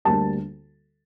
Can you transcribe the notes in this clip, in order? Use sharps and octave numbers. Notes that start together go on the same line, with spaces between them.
D2 D3 G3 A#3 A5